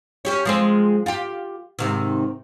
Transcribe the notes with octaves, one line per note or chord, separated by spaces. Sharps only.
C#4 G4 C#5
F3 G#3 C4
F4 G4
G#2 C3 D#3